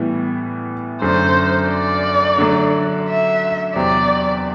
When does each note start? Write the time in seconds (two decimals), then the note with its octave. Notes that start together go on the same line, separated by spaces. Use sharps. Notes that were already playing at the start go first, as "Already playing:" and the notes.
Already playing: A2 E3 G3 B3
1.02 F#2 D3 F#3 A3 D4 C5
1.69 D5
2.38 D3 F#3 A3
3.08 E5
3.75 E2 C3 F#3 C4 G4 D5